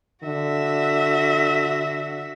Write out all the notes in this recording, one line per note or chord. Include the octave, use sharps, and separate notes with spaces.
D3 F#4 E5